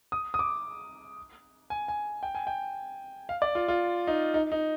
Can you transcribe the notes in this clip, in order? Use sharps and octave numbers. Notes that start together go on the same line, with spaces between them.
D#6
D#6
D6
G#5
G#5
G5
G#5
G5
F5
D5
F4
F4
D#4
D#4
D#4